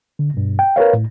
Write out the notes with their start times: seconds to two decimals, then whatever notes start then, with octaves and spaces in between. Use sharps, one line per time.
0.19 D3
0.34 G2 B2
0.59 G5
0.76 A#4 B4 C#5 F5
0.93 A2